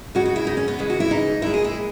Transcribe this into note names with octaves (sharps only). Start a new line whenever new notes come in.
C#3 G#3 F#4
F#4
E4
D#4
C#4
B3
C#3 E3 G#3
F#4
E4
D#4
A#2 G#3 E4
G#4
E4